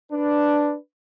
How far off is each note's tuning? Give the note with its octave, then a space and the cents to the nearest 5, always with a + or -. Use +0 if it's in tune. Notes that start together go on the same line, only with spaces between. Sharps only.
D4 +0 B4 +0